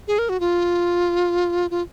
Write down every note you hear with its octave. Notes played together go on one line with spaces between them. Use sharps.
G#4
A#4
F#4
F4
F4